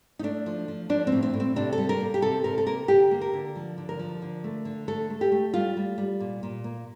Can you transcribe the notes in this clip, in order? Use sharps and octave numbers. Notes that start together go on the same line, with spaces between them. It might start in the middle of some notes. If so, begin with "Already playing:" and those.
D#4
A3 D4
F3
F3
F3 D4
C4
A2
C4
A2
C4
C3 D4
A4
G3
A#4
A#3
G4
C3 A4
C3 A#4
A4
A#3 A#4
D3 G4
A#3
A#4
D3
F3
D3
A#4
F3
D3
A3
D3
A3 A4
A3
G4
A3
G3 F4
G3
G3
A#2
A#2
A#3